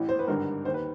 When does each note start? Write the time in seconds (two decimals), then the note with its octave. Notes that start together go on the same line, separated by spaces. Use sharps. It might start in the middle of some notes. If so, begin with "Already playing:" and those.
Already playing: A1 A2 E3
0.09 C5
0.19 B4
0.27 G#1 G2 D3 A#4
0.65 D#2 D#3 C5
0.74 B4